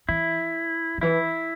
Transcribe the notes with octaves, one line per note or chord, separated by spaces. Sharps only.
E3 E4
D3
E3 E4